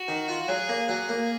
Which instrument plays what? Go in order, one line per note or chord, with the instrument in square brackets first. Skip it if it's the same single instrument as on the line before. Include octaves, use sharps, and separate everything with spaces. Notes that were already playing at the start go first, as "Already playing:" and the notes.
Already playing: [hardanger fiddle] F#4
[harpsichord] D#3
F4
[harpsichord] F#3 [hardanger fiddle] G#4
[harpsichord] A#3
[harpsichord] F#3 [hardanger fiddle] G#4
[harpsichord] A#3